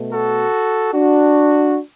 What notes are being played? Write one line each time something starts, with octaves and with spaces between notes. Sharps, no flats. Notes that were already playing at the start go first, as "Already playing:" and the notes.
Already playing: B2 A3
F#4 A4
D4 F#4